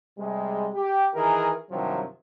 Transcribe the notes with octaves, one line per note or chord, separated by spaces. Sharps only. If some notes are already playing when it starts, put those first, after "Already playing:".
C3 G3 G#3
G4
D#3 E3 G#4 A#4
G2 C3 D#3 F3 F#3